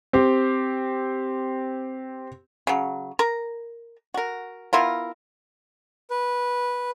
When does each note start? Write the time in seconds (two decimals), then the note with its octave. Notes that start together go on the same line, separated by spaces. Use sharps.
0.13 C4 G4
2.67 C#3 F#3
3.19 A#4 A#5
4.14 F#4 A#4
4.73 B3 E4 F4 A#4
6.10 B4